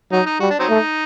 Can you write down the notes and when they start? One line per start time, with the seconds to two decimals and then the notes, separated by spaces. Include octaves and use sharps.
0.12 F#3 D#4
0.26 D#4
0.40 G3 F#4
0.50 D4
0.59 F#3 C4 D#4
0.70 A3